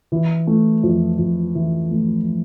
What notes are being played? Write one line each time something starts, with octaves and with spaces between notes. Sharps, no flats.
E3
A3
F2
F2
E3
A3